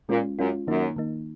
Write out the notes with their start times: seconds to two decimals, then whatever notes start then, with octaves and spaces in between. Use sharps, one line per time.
0.09 A#2 G#3 C#4 F4
0.38 F#2 G#3 C#4 F4
0.67 F#2 D#3 A#3 D#4
0.96 D#3 A#3 D#4